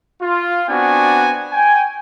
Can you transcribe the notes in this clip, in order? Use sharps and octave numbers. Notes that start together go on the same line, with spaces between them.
F4
B3 C4 D4 F#4 G#5
G5 G#5